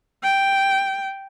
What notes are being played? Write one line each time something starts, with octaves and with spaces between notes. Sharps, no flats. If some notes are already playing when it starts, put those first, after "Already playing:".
G5